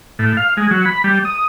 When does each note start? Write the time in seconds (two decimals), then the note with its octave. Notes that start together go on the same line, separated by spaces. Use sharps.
0.19 A2
0.37 F5
0.57 G#3
0.71 F#3
0.85 B5
1.04 G3
1.25 D#6